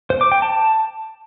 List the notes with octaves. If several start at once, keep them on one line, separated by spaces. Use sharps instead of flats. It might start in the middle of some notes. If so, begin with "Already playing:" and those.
C5
D6
G5
A5